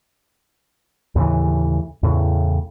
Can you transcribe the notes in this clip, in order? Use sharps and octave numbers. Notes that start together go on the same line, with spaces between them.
D#2 A2 C#3 E3
E2 A2 C#3